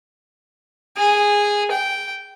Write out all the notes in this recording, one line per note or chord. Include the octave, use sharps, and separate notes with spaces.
G#4
G5